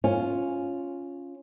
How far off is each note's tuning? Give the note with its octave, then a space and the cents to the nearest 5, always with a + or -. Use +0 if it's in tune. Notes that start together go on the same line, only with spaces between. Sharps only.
C#4 +0 F4 +0